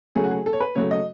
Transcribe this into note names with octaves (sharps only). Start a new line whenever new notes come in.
C#3 F#3 A3 G#4
F#4
G#4
A4
C#5
B4
C#3 F#3 A3 C#5
D#5